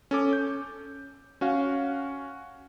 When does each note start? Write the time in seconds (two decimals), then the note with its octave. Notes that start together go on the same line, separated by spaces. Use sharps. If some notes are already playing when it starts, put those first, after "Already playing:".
0.11 C#4 A4 D6
0.33 G6
1.41 C#4 F#4 F5